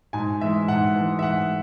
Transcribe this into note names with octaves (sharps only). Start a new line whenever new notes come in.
G#2 G#5
E3 G#3 E5
G#2 F#5
E3 G#3
E5
G#2 F#5